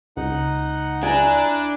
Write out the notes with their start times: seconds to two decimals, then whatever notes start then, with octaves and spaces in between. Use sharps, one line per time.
0.17 C#2 D#4 F#5
1.03 D4 E4 G#5 A#5 F#6